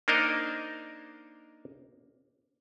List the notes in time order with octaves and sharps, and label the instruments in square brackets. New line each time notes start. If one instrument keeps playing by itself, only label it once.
[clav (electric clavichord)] A#3 D4 D#4 A#4 C5 D#5